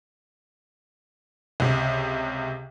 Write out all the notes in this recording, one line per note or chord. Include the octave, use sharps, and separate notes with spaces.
C#2 C3